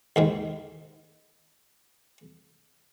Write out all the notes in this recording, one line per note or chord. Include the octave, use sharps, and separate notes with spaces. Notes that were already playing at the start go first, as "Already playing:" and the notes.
D#2 G#2 D#3